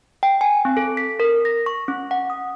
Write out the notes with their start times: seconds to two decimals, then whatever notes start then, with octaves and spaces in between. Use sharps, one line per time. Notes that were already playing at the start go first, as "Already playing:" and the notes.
0.23 G5
0.41 G#5
0.65 C4
0.77 A4
0.97 B6
1.20 A#4
1.45 A#6
1.66 C#6
1.88 C#4
2.11 F#5
2.30 D#6